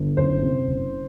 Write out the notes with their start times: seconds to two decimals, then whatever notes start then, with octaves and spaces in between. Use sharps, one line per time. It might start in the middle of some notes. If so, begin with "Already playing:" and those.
Already playing: G1
0.17 F#1 C5
0.42 C3
0.67 F#1